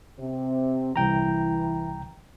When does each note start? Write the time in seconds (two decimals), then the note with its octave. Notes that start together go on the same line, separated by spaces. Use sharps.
0.19 C3 C4
0.96 C2 E3 G5 A#5